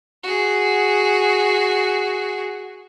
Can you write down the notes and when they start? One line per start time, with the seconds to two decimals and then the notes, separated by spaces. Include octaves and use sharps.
0.23 F#4 G#4